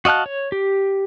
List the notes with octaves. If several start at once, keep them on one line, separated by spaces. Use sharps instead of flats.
F#4 D#5 F5 A5 F#6
C#5
G4